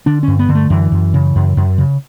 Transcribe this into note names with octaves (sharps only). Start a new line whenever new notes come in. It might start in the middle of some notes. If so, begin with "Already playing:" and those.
D3 D4
G2 C#4
B3
D3
A3
F#2 E3
F#2
C#3
F#2
F#2
C#3